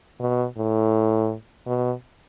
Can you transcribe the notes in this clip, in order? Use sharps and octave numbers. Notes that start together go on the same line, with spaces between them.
B2
A2
B2